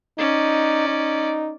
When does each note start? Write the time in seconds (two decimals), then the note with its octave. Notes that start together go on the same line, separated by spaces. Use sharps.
0.18 C#4 D#4 D5
0.88 D#4